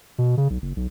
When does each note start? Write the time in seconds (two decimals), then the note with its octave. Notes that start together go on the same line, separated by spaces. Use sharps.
0.18 B2
0.37 C#3
0.50 B1
0.62 F#1
0.76 B1